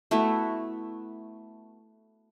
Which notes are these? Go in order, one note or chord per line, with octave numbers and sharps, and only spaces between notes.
A3 B3 E4 F#4